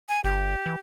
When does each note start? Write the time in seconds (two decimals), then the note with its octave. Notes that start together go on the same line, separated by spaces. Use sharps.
0.09 G#5
0.24 G1 G4
0.66 E3